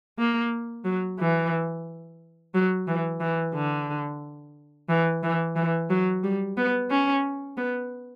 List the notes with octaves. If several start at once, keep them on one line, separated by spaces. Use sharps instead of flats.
A#3
F#3
E3
F#3
E3
E3
D3
E3
E3
E3
F#3
G3
B3
C#4
B3